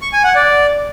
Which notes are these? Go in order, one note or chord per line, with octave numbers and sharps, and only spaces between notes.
C#6
G#5
F#5
D5